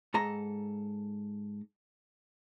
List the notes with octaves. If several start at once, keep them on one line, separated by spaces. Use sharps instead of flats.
G#2 A4 A#5